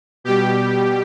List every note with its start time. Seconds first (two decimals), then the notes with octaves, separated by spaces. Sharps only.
0.24 B2 G3 G4